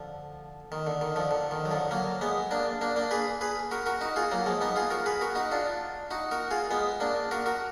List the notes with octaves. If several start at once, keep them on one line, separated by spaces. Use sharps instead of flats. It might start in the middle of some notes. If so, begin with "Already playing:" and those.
Already playing: D3 F3
D#3
D3
D#3
D3 F3
D3
D#3
F#3
D3 F3
F#3 A#3
G#3 B3
A#3 D4
A#3 D4
A#3 D4
G#4 B4
G#4 B4
F#4 A#4
F#4 A#4
D#4 F#4
F4 G#4
F#3 A#3
F3 G#3
B3 D#4
F4 G#4
F#4 A#4
G#4 B4
F#4 A#4
D#4 F#4
D4 F4
D#4 F#4
F#4 A#4
F4 G#4
G#3 B3
A#3 D4
F#4 A#4
F#4 A#4